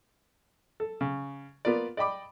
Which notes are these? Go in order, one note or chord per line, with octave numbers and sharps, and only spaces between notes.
A4
C#3
A#3 B3 F4 A#4 D5
D5 D#5 G5 B5 D6